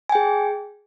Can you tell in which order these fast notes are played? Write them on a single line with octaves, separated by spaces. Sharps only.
G#5 G5 G#4